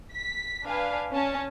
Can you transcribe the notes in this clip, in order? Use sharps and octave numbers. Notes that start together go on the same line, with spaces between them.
B6
D4 B4 F5 G#5
C#4 A5